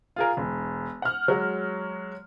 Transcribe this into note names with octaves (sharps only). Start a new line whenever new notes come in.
F4 G#4 A#4
E1
F#5 F6
F#3 G#3 F#4